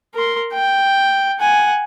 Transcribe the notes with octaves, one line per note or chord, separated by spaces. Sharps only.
A#4 C6
G5
F#5 G#5